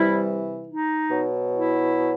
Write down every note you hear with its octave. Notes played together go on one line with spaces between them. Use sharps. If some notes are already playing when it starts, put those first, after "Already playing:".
Already playing: C3 E3 G3 E4
D#4
B2 F#3
E4